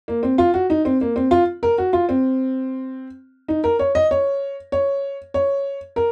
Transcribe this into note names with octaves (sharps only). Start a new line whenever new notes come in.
A#3
C4
F4
F#4
D#4
C4
A#3
C4
F4
A#4
F#4
F4
C4
D#4
A#4
C#5
D#5
C#5
C#5
C#5
A#4